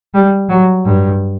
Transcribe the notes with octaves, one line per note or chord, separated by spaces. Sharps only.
G3
F#3
G2